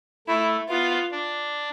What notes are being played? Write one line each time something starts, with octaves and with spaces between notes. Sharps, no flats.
A3 E4
B3 F4
D4